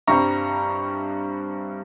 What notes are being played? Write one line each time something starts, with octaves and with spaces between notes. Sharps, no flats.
G2 G3 C4 A#5 C#6